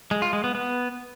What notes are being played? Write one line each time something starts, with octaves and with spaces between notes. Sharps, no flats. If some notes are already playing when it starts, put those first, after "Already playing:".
G#3
F4
G#3
B3
B3